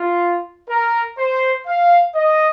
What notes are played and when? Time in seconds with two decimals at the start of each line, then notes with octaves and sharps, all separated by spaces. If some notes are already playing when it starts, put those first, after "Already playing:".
Already playing: F4
0.69 A#4
1.18 C5
1.67 F5
2.15 D#5